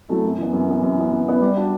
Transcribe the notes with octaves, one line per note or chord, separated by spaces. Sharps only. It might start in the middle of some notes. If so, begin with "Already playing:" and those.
F#3 A3 E4
F#2
E3 B3
F#2
E3 B3
F#2
E3 B3
F#2
E3 B3
G3
D4 F#4